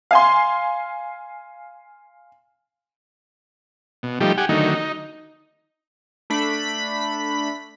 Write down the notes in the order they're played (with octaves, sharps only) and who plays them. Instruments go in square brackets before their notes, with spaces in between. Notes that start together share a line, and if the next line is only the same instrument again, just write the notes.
[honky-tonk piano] F5 G#5 C6
[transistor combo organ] B2
F3 G3 A3 D#4 G4
G4 F#5 G#5
D3 D#3 F#3 A3 D#4
D#4
[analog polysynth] A3 D4 B5 B6